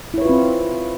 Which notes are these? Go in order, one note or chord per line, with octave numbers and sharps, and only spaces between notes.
C4 E4 F4 B4 C#5